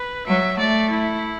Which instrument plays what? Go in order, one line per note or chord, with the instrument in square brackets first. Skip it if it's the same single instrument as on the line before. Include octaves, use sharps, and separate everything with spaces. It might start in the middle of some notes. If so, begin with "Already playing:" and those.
Already playing: [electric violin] B4
[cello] F#3 [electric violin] E5
[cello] A3 [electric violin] D5
[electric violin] E4